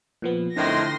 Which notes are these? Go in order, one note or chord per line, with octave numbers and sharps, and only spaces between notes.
A#2 F3 B3
F2 A2 D3 D#3 C6 A#6